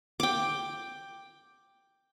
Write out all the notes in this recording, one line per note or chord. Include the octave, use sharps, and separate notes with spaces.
G5 D6